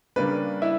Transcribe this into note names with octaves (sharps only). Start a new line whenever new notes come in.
C#3 G3 A#3 D4 B4
E4 E5